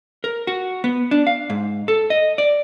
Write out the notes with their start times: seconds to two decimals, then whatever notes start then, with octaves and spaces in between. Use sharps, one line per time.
0.24 A#4
0.47 F#4
0.84 B3
1.11 D4
1.27 F5
1.50 G#2
1.88 A4
2.10 D#5
2.38 D5